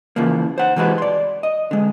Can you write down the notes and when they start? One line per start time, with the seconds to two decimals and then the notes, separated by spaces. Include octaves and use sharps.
0.16 C#3 E3 F3 A#3
0.58 C5 F#5
0.76 C3 E3 G#3 C4 F#4 B4
0.98 D5 C6
1.43 D#5
1.71 D3 G#3